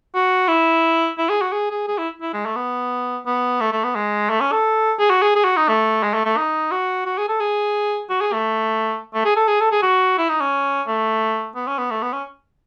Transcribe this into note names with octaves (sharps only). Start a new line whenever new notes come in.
F#4
E4
E4
G#4
F#4
G#4
G#4
G#4
E4
E4
G#3
A3
B3
B3
A3
A3
B3
G#3
A3
C#4
A4
G#4
F#4
G#4
G#4
F#4
D#4
A3
G#3
A3
A3
D#4
F#4
F#4
G#4
A4
G#4
F#4
G#4
A3
A3
G#4
A4
G#4
A4
G#4
F#4
E4
D#4
C#4
A3
B3
C#4
B3
A3
B3
C#4